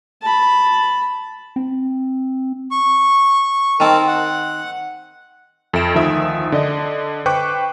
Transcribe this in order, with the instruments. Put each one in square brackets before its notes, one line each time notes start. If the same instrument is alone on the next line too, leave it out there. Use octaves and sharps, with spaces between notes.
[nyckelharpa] A5 B5
[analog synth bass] C4
[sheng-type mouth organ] C#6
[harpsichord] D#3 C4 [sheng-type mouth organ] A#4 A5
[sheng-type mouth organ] F#5
[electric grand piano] F2 A4 E5 D7 E7
D2 D#3 F3 E5 D#6
D3 D5 D#5
B4 C5 G5 C#6 D6 F#6